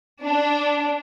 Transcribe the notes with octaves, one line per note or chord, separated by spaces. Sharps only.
D4